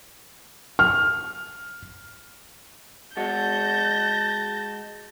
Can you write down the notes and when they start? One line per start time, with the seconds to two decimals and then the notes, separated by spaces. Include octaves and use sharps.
0.79 F6
3.17 G#3 F#4 A5 G6 A#6